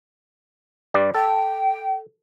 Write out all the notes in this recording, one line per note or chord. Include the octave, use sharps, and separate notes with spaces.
G2 G3 D5
A4 G5